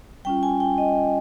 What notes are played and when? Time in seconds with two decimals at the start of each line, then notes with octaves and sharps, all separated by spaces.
0.25 G3 C#4 F4 G5
0.43 G#5
0.60 G5
0.78 D#5